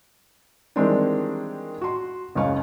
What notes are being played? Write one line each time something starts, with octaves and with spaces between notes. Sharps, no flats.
D#3 E3 G3 G#3 C4 D4
F#4 C6
F#1 C#2 C#4 F5 C#6